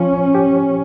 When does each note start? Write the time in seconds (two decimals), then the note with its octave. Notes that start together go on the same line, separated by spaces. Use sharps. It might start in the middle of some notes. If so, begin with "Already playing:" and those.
Already playing: F3 C#4 C5
0.35 G4